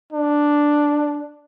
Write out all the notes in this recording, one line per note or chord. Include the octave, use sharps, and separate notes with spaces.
D4